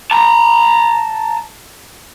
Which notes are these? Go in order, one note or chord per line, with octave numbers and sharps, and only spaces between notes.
A5 A#5